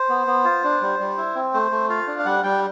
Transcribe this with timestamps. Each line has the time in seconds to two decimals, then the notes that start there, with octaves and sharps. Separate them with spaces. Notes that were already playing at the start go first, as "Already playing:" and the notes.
Already playing: C5
0.09 B3
0.27 B3
0.45 F4
0.64 D4
0.81 G3
0.99 G3
1.18 E4
1.35 C4
1.54 A3 C5
1.71 A3
1.89 F4 F5
2.07 D4
2.19 F5
2.25 G3 F#5
2.44 G3 G5